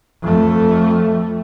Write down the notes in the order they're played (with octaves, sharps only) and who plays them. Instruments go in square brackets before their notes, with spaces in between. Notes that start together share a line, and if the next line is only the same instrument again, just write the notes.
[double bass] F2 A3